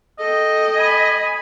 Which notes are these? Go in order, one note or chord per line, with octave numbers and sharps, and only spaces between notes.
A4 D#5 G5
G#5 B5